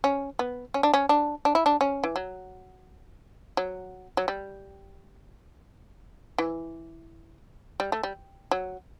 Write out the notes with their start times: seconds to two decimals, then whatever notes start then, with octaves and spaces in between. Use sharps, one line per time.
0.04 C#4
0.39 B3
0.74 C#4
0.83 D4
0.94 C#4
1.09 D4
1.45 D4
1.55 E4
1.66 D4
1.81 C#4
2.04 E3
2.16 F#3
3.57 F#3
4.17 F#3
4.28 G3
6.38 E3
7.80 G3
7.92 A3
8.03 G3
8.51 F#3